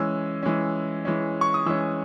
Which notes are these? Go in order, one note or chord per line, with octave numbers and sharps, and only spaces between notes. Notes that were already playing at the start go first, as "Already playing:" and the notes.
Already playing: E3 G#3 C#4 E6
E3 G#3 C#4
E3 G#3 C#4
C#6
D#6
E3 G#3 C#4 E6